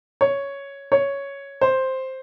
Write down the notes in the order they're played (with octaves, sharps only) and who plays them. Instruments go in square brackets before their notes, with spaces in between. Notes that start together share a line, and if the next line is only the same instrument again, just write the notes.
[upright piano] C#5
C#5
C5